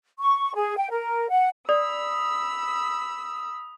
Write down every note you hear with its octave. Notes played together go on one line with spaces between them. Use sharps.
C#6
G#4
G5
A#4
F#5
D5 B5 D#6 E6